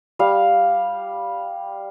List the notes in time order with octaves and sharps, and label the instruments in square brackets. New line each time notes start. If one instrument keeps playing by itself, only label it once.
[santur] G3 F5